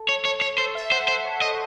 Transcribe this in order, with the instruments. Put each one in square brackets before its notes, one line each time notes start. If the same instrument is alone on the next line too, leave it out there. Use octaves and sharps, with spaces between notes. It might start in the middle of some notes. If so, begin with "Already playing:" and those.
Already playing: [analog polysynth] A4
[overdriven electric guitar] C#5
C#5
C#5
[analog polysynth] A4 [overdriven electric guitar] C5
[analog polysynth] E5
[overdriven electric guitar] C5 [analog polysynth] F#5
[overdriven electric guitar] C5 [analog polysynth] E5
[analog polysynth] C#5
[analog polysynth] C5 [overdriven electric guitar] D#5